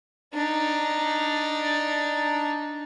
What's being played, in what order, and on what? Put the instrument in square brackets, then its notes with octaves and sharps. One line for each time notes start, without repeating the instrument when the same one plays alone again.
[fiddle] D4 D#4